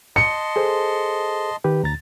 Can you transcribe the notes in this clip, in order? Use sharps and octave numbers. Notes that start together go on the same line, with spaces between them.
D#5 A5 C6 C#7
G#4 A4 C5
D#3 G4 B4
D2 A#5 A6